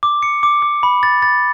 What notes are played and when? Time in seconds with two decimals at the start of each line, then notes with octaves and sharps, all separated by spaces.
0.03 D6
0.23 C#7
0.43 D6
0.62 D6
0.83 B5
1.03 A6
1.22 A6